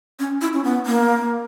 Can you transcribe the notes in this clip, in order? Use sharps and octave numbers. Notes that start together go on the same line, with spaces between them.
C#4
E4
C#4
B3
A#3